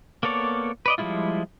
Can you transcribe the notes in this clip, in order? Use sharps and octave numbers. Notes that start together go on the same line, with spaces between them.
A#3 B3 A4 C#5 D5
B4 D5 D#5
F3 G3 G#3 E4 F4